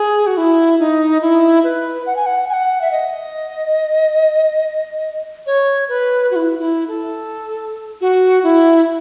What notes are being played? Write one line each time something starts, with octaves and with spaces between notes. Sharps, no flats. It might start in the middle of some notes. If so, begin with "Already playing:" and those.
Already playing: G#4
F#4
E4
D#4
E4
B4
F#5
G#5
F#5
G#5
F#5
E5
D#5
C#5
B4
F#4
E4
E4
A4
F#4
E4